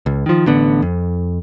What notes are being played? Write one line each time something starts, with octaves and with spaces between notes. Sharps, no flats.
C#2
D#3 F3
A1 D3 B3
F2